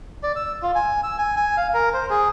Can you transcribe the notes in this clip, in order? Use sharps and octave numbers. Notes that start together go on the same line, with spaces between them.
D5
E6
F4
G#5
E6
G#5
G#5
F5
A#4
C5
G#4